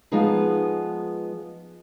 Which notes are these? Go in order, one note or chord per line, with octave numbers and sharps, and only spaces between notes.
F3 G#3 B3 D#4 G#4 B4